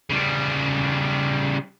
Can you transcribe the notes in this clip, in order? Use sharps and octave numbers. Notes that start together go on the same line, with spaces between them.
C#3 G3